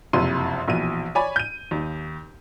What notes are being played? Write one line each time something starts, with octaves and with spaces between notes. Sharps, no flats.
F#1 F2 C3 C6 D#7
A#1 B2 E3 D#7
C#5 D5 G#5 B5
G6 D#7
D#2